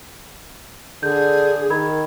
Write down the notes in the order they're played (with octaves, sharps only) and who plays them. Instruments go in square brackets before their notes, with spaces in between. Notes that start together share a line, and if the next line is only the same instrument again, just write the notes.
[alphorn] D3 [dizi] G#4 [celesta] G6
[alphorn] D#3 [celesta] A#4 B5 G#6